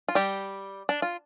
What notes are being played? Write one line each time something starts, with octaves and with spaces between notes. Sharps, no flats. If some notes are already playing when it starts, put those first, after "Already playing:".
F4
G3 G4
D4
F4